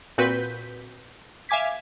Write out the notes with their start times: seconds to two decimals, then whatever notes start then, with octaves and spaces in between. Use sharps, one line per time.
0.18 A#2 C4 F#4 B4 G6 B6
1.49 E5 F5 G#5 D6 G#6 B6